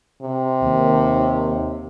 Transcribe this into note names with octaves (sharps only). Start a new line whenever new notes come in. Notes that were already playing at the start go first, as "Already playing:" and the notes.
C3
D#2